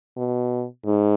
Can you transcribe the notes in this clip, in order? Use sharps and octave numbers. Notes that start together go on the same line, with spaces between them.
B2
G#2